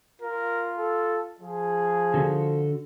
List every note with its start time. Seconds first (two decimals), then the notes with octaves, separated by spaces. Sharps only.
0.22 F4 A#4
0.78 A4
1.40 F3 G#4
2.14 D3 F#4 A4